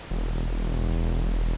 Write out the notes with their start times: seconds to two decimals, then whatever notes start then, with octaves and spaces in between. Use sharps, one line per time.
0.11 E1